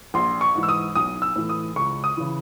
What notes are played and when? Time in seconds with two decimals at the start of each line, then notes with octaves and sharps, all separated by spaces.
0.14 A#1 C6
0.41 C#6
0.55 G#2 E3
0.63 E6
0.69 D#6
0.95 B1 D#6
1.22 E6
1.36 A2 E3
1.49 D#6
1.76 C#2 C#6
2.04 D#6
2.17 C#3 E3